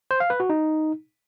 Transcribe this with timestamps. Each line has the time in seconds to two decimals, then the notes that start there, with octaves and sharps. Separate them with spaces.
0.11 C5
0.20 F5
0.30 B4
0.40 F#4
0.50 D#4